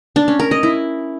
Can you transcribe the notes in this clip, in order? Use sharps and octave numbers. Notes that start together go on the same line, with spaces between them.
D4
C#4
A#4
D#5
E4